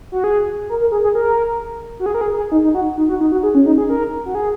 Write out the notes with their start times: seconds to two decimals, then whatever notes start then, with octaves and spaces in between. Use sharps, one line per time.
0.12 F#4
0.24 G#4
0.69 A#4
0.81 A#4
0.92 G#4
1.04 G#4
1.15 A#4
2.00 F#4
2.06 G#4
2.14 A#4
2.21 G#4
2.37 G#4
2.52 D#4
2.64 D#4
2.75 F#4
2.98 D#4
3.09 F#4
3.21 D#4
3.32 F#4
3.43 G#4
3.55 C#4
3.66 D#4
3.78 G#4
3.90 A#4
4.26 F#4
4.35 G#4